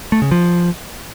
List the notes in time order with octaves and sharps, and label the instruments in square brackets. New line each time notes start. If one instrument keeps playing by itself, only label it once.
[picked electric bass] A3
C#3
F3